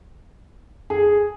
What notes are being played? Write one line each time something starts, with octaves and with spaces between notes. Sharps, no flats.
G#4